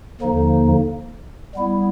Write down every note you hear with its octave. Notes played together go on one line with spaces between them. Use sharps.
D#2 D3 F3 A#3 D#4
G3 B3 E4